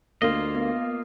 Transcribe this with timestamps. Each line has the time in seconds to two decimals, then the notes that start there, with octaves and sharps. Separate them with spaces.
0.22 D2 A#3 F4 D#5
0.55 B3